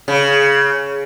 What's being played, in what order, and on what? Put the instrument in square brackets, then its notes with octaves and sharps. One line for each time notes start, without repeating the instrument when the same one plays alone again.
[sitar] C#3